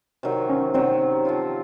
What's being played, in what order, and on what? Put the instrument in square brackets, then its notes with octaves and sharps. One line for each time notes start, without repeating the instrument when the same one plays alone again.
[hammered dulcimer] C3 D#3 F#3
[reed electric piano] C#4
[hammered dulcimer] C3 D#3 F#3 [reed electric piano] C4
[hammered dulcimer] F3 C4 F4